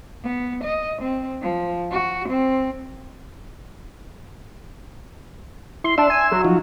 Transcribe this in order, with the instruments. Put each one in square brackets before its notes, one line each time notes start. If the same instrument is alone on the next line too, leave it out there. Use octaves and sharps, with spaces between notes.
[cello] B3
D#5
C4
F3
F#4
C4
[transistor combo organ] E4 [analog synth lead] C6
[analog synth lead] D4 [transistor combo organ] E5 C6 E6
[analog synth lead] G#5
F#3
[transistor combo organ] F3 D#4 F4